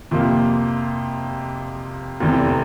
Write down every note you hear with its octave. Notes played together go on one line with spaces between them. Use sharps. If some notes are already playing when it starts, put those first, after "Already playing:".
F2 C3 F3 A#3
F1 E2 C3